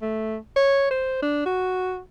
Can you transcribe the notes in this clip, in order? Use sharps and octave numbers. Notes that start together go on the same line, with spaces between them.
A3
C#5
C5
D4
F#4